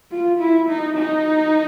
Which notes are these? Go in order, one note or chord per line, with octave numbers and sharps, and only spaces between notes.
F4
E4
D#4
D#4